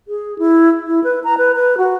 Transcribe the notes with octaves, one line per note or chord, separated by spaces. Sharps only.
G#4
E4
E4
B4
A#5
B4
B4
F#4